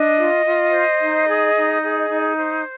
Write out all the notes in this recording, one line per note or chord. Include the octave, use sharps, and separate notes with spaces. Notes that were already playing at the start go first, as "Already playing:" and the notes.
Already playing: D4 D#5
F4
F4
C5
D#4
G#4
D#4
G#4
D#4
C5